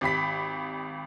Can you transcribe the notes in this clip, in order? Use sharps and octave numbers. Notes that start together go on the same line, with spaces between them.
G#1 G4 B5 B6